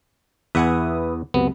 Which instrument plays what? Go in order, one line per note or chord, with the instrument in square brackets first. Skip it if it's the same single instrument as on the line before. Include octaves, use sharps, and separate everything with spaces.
[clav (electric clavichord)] E2 F#5 G#5 [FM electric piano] B4 E5 D#6
[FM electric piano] C#2 F#2 C3 [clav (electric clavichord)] B3